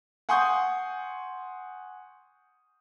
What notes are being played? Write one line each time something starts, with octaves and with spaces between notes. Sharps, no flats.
F#5 G#5 C6 C#6 D#6 G6